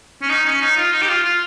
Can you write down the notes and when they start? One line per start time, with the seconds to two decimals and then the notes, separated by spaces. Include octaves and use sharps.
0.22 C#4
0.29 D#4
0.45 C#4
0.61 D#4
0.77 F4
0.92 D#4
1.02 G4
1.08 F4
1.24 F4